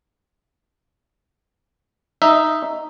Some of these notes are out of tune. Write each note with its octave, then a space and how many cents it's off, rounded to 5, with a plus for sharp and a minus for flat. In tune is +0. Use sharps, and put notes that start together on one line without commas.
D#4 +0 E5 +0